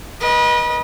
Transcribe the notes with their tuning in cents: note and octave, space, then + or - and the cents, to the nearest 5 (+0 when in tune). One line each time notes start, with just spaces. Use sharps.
B4 -35 D#5 +0